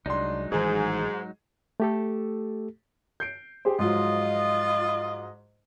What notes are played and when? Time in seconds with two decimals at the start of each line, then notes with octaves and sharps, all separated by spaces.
0.06 C2 F#3 G#3 D4 D#4 C6
0.52 A1 G#2 D#3 E3 G#4
1.80 A3 G4 A4
3.20 G6 C7 D7
3.65 G4 G#4 C5
3.79 G#2 F3 F#3 F4 D#5